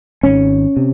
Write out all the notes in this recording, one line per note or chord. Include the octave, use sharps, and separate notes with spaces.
G#1 G#2 C#4
C3